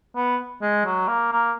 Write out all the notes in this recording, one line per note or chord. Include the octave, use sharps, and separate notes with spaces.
B3
G#3
F#3
A#3
A#3